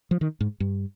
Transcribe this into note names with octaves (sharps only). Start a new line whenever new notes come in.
F3
D#3
G#2
G2